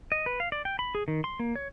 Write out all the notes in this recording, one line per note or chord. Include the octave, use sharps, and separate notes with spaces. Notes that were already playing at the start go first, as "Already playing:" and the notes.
D#5
B4
F5
D5
G5
B5
G#4
D#3
C6
A#3
C#5